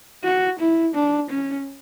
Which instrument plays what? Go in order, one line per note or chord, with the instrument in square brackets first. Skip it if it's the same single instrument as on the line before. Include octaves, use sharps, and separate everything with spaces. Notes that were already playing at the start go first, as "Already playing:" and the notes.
[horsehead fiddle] F#4
E4
D4
C#4